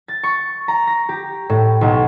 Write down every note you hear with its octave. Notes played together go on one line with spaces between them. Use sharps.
A6
C#6
A#5
A#6
G4
A2
B1